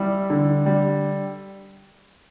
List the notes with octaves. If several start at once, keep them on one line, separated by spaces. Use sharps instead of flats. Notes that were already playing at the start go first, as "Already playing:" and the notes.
Already playing: G3 E4
D3
G3